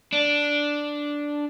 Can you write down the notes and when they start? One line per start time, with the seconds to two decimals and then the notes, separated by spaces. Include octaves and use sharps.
0.13 D4